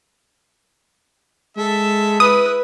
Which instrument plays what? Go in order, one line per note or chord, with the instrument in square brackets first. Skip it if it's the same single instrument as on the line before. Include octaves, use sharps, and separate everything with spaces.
[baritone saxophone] G#3 [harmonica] A4 E5
[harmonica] E4 [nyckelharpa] B4 [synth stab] D#6